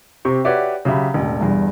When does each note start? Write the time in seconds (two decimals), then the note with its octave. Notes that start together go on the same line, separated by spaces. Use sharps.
0.25 C3 C4 G4 C#6
0.45 F#4 G4 B4 C#5 D5 E5
0.85 C#3 F#3 G4 E5 B5
1.14 E1 A1
1.41 G1 E2 G2